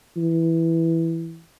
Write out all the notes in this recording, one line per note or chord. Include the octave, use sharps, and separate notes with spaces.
E3